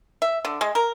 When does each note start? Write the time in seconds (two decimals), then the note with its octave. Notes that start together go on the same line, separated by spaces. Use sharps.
0.22 E5
0.45 D3
0.61 G#3
0.75 A#4